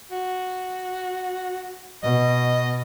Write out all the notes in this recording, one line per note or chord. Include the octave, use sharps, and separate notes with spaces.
F#4
B2 D#5